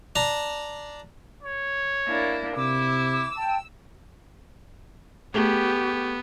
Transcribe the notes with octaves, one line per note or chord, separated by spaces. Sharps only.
D4 A#5
C#5
A#3 D4 E4
C3 E4 D6 E6
G5 A5
A3 B3 G4 G#4 A5